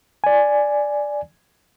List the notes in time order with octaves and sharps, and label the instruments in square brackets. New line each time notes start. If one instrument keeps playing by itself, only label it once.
[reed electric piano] D5 G#5